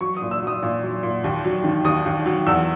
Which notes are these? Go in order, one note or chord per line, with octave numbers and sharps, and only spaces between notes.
F#3 C#6
D#6
A#2
E6
F#3 D#6
A#2
F#3
A#2
D#2
F#3
D#3
D#2 D#6
D#2
F#3
E2 E6